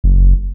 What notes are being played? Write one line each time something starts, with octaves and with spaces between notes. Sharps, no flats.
F#1